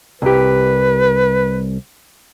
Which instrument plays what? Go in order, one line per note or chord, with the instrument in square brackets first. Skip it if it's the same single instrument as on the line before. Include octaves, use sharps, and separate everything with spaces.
[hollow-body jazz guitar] C2 G4 [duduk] B4